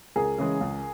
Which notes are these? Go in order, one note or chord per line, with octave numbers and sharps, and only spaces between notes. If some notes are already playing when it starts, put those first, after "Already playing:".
C#2 G#4 A#4
C#3 E3 G#3
C#2